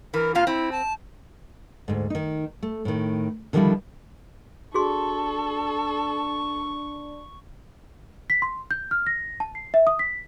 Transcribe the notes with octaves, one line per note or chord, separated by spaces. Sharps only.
E3 A#4
C3 A#3 F4 F5
C4 E4
A5
D2 G#2
D#3 D#4
A3
A2 D#3
D3 D#3 F3 G3 D4 E4
D4 F#4 G#4 A4 C6 C#6
B6
C6
G6
F6
A#6
A5
C7
E5
D#6
B6